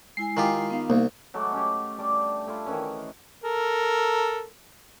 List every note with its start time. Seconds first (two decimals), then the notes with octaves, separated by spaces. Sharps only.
0.17 G#3 E4 G#5 C7
0.37 D#3 F4 G4
0.70 B3 D#4 F5
0.90 C2 A#3
1.34 F#3 G#3 A3 D6
1.52 C#4 G4
1.98 G3 D4 D5
2.47 A3 E4 F4
2.66 D#3 E3 C#4
3.44 A4 A#4